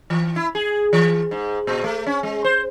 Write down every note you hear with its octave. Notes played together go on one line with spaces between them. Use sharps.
E3
E4
G#4
E3
G#2
A#2
A3
C#4
G#3
C5